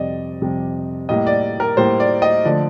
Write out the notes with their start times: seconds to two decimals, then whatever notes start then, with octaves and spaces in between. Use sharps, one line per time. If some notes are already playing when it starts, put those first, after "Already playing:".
Already playing: F2 C3 G3 D5 D#5
0.42 F2 C3 G3
1.09 A2 G3 A#3 D#5
1.27 D5
1.60 A#4
1.77 A2 G3 A#3 C5
2.00 D5
2.22 D#5
2.45 D3 F3 A3 D5